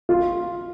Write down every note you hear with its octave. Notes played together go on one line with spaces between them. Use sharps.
F4